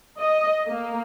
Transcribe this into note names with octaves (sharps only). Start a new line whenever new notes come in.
D#5
A#3